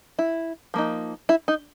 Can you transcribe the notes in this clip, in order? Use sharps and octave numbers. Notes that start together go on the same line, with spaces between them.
E4
F3 A#3 D#4
E4
D#4